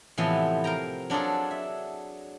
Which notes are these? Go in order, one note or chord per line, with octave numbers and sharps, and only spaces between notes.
A2 C3 E3 F3 B3
A#4 F5 G5 A#5
F#3 D4 F4 G#4 A4
E5